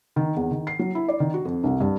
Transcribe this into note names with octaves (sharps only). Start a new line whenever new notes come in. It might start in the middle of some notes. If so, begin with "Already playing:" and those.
D#3
E2
D#3
C7
F#3
E4
D5
D#3
F#4
F2
C2
G2